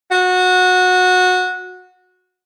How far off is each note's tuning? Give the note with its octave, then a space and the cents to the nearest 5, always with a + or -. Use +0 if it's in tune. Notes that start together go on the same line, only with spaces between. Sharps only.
F#4 -20